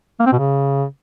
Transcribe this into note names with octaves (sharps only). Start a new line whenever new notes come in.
A#3
C4
B2
C#3